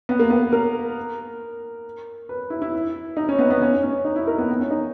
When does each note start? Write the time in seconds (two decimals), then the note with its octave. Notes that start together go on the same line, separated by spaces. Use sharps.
0.09 B3
0.19 A#3
0.30 B3
0.53 A#4
2.29 B4
2.50 E4
2.62 E4
3.17 D#4
3.29 C#4
3.39 B3
3.50 B3
3.62 C#4
3.82 C#4
4.05 D#4
4.16 E4
4.27 A#4
4.38 B3
4.49 B3
4.60 C#4
4.71 D#4